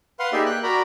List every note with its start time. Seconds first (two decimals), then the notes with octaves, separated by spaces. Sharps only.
0.19 B4 F5 F#5 C6
0.33 A#3 D#4 G4 G#4 D5 E5
0.46 G5 F#6
0.63 F#4 A#4 D5 A#5 B5